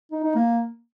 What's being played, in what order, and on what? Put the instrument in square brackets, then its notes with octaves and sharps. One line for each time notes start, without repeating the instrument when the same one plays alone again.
[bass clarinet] D#4
D#4
A#3